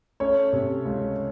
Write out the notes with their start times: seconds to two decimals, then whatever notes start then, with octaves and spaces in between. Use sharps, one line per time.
0.20 A3 C#4 C#5
0.53 C3
0.85 C#2